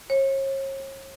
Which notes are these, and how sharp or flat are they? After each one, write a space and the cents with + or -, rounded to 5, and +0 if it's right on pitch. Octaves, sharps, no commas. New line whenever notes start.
C#5 -40